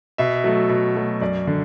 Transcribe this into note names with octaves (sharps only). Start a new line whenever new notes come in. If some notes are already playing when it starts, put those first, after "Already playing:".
B2 E5
F#3 A3
B2
F#3 A3
F#2 D5
D3